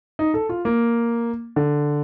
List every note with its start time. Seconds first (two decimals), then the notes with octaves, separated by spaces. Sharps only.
0.19 D#4
0.34 A4
0.49 F4
0.65 A#3
1.56 D3